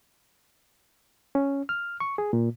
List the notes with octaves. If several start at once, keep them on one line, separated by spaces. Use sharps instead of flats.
C#4
F6
C#6
G#4
A#2